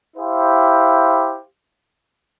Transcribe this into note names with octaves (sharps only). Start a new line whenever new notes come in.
E4 G4 C5 F5